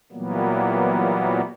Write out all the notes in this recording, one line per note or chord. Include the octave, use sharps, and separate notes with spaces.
A#2 E3 F#3 G3 A#3 B3